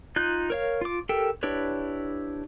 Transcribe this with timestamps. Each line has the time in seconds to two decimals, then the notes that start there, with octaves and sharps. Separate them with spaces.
0.16 D#4 F4 F#6 G6
0.50 A#4 C#5 F5
0.81 F4 D6
1.09 G4 A4 A#4 G5
1.43 D4 E4 G4 B4 C#5